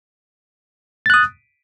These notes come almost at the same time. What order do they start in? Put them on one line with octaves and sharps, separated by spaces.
A6 F#6 D#6